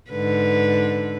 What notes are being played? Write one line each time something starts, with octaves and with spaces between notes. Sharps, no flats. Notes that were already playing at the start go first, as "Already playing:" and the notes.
G#2 D3 B4